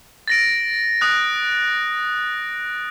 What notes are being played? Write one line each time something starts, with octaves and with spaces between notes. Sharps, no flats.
A6 A#6 D7
D#6 F#6